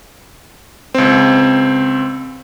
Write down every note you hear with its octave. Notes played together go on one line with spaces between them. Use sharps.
C#2 C4